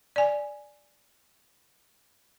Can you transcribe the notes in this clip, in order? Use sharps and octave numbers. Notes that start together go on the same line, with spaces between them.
D5 G#5